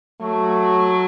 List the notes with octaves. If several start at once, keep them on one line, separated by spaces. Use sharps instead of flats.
F#3 A3